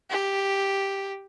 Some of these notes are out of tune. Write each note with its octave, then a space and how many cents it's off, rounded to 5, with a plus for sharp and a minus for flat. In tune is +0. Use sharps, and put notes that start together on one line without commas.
G4 +0